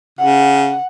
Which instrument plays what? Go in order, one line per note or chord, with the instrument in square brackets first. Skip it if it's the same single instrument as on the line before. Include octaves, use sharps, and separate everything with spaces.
[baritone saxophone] C#3 [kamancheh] F#5